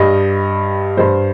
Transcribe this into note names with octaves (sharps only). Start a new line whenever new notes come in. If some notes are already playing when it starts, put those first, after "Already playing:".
Already playing: G2 G3 D#5
G2 G3 C5